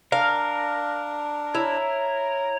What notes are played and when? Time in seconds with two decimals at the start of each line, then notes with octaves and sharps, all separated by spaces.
0.12 D4 A#4 F5
1.55 E4 C#5 A#5